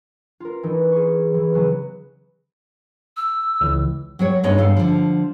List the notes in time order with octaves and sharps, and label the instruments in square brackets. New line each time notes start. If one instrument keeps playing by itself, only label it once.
[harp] F4 A#4
E3 A3 D#4
G#4 C#6
E3
C#3 F#3 B3
[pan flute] E6
[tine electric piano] C#2 E3
[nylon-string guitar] F#3 G3 C#5
G2 G#3 B3 D#4 C#5 D#5
G2 A4 F5
D3 F3